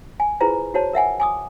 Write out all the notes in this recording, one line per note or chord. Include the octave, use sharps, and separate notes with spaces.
G#5
E4 F4 G#4 B4 C5 A#5
F#4 C5 C#5 A5
A#4 E5 F#5 G#5
G#5 D6 D#6